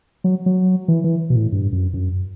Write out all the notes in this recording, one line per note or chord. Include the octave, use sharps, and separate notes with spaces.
F#3
F#3
E3
E3
B2
A2
G2
F#2
F#2